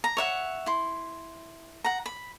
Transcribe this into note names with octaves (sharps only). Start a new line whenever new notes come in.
A#5
C#5 E5 F#5
E4 C6
F#5 A#5
B5